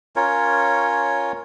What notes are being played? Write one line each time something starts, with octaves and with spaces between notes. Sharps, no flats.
C#4 F4 A#4 C#5